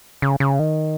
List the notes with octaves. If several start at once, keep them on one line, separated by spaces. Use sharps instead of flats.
C#3
C#3
D#3